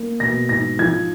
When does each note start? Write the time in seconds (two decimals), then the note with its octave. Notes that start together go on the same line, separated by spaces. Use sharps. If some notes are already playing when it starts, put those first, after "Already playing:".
Already playing: A#3
0.20 B2 A#6
0.49 G#2 A#6
0.79 F3 G#6